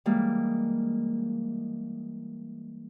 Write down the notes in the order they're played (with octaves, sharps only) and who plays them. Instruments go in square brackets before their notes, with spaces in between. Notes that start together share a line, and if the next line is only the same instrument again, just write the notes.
[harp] E3 G3 G#3 A#3